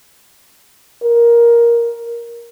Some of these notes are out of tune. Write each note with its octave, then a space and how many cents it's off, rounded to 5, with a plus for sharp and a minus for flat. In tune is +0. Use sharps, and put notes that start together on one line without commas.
A#4 +10